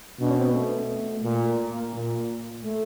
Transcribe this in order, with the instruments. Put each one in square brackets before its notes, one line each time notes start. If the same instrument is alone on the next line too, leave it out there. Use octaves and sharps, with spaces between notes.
[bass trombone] B2 [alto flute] D4
[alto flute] C#4
C4
B3
A3
[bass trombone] A#2 [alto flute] A#3
[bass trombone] A#2
[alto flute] A3